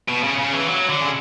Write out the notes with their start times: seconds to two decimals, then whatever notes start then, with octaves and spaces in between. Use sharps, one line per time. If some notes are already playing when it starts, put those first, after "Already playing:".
0.08 B2
0.23 C#3
0.39 C#3
0.54 E3
0.69 F#3
0.89 D3
1.01 C#3